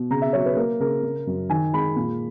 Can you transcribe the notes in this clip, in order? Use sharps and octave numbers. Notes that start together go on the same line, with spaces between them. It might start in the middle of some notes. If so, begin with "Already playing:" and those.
Already playing: B2
C#3 A#5
E5
F#3 C#5
B4
A#3 A#4
C#3 A#4
C#3
F#2
D#3 G#5
G#3 B5
A#2